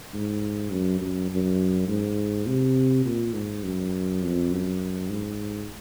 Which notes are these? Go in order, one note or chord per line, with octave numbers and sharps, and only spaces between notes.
G#2
F#2
F#2
F#2
G#2
C3
A#2
G#2
F#2
F2
F#2
G#2